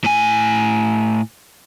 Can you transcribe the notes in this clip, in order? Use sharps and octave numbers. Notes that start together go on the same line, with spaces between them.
A2 G#5